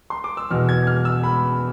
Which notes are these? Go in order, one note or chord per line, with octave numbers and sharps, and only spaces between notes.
C6
D6
E6
E2 B2 F6
G#6
F6
E6
B5